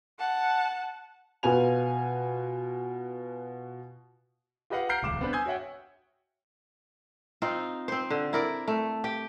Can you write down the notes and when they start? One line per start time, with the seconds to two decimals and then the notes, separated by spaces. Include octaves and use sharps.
0.18 F#5 A5
1.43 B2 F4 B4 G#5 F7
4.70 F4 G4 B4 D#5 F5 F#5
4.89 F#5 A#5 F6 G6 C7 D7
5.02 D#1 C#2 D6 E7
5.21 B3 C4 D4 B4
5.33 G#5 D#6 E6 G6 G#6
5.46 F#4 C#5 E5 F#5 G5
7.42 C4 D#4 F4
7.88 C4 C5
8.10 D3
8.33 E4 A#4 D5
8.68 A3
9.04 G4 G5